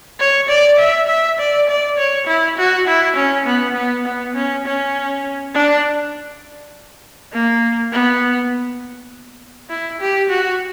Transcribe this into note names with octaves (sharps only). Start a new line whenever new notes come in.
C#5
D5
E5
E5
D5
D5
C#5
E4
F#4
E4
C#4
B3
B3
B3
C#4
C#4
D4
A#3
B3
E4
G4
F#4